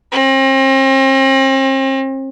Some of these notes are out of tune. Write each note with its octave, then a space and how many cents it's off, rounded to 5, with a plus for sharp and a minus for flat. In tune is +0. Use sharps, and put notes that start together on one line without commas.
C4 +40